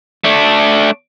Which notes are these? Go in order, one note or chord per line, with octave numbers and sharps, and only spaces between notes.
A3 D4